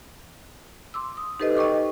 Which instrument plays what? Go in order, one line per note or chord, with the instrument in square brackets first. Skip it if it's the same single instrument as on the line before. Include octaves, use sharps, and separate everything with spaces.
[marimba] C6 D6 E6
D#6
D#4 G4 A4 B4 C5 D#5
D#5 G5 C#6 D6